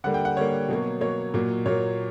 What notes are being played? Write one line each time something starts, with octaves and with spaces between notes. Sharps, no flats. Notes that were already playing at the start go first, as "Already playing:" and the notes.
D3 G3 A#3 F#5
G5
F#5
D3 G3 A#3 C#5
B2 F#3 A#3
B2 F#3 A#3 C#5
A#2 F#3 A#3
A#2 F#3 A#3 C#5